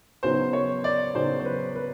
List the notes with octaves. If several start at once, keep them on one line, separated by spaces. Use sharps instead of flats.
C#3 F#3 B3 D#4 C5
C#5
D5
C#3 F#3 B3 D#4 C5
C5
B4
B4